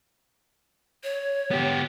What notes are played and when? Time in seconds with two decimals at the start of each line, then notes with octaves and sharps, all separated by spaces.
1.03 C#5
1.51 B3 G4